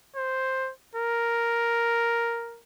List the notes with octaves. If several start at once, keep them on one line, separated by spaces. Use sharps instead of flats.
C5
A#4